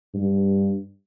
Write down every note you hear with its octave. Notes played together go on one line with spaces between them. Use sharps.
G2